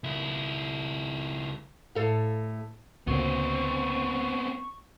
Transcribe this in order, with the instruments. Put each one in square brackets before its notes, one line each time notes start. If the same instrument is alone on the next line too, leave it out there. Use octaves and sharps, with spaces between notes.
[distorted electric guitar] C#2 E4
[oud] A2 A4 F5
[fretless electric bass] D2 A#2 C#3 [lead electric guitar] B3 C4 [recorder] C#6